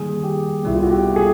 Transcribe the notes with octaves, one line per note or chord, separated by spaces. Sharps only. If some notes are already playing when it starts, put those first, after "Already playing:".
Already playing: D#3 G3 A#3 G#4
G4
C2 B2 G3 B3 E4
F4
F#4
G4
G#4